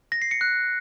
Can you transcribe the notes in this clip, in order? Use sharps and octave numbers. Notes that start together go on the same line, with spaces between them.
A#6
C7
C#7
F#6